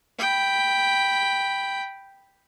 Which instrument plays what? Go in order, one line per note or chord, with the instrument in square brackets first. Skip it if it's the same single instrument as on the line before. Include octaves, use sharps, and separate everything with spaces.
[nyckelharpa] G5 B5